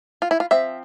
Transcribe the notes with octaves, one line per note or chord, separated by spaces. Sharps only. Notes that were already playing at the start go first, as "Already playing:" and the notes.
F4
E4
F4
F3 C4 E5